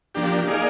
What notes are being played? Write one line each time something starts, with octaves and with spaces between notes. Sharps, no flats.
F3 A#3 D4 G4
A#3 D#4 G#4 D5 F5